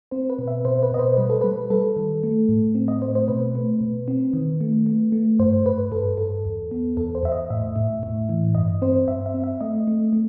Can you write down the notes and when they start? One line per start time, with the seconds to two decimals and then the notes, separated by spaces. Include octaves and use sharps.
0.11 C4 C5
0.30 B4
0.39 B2
0.48 E5
0.65 B2 C5
0.83 B4
0.92 B2 D#5
0.99 C5
1.17 G3 B4
1.30 A4
1.41 G3 B4
1.70 G3 A4
1.97 D#3
2.23 A3
2.49 A2
2.75 C4
2.88 D#5
3.02 A3 C5
3.15 C5
3.28 B2 B4
3.55 A3
3.81 B2
4.08 C4
4.33 D#3
4.61 A3
4.86 A3
5.12 A3
5.39 G2 C5
5.66 G2 B4
5.91 G2 A4
6.18 G2 A4
6.45 E2
6.71 B3
6.97 E2 A4
7.15 C5
7.23 E2 E5
7.32 D#5
7.50 A2 E5
7.76 A2
8.03 A2
8.29 E3
8.55 G2 D#5
8.82 C4 C5
9.08 G2 E5
9.26 E5
9.34 C4
9.44 E5
9.61 A3 D#5
9.87 A3
10.13 A3